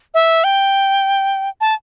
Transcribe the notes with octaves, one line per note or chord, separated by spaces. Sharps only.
E5
G5
A5